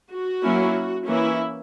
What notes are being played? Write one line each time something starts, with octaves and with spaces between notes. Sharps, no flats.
F#4
F#3 A#3 C#4 E4
E3 A#3 C#4 E4